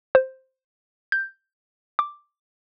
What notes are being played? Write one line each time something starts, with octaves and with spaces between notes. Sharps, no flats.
C5
G6
D6